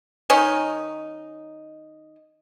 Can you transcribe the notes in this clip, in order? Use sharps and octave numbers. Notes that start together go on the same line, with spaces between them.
D#3 C#4 D#4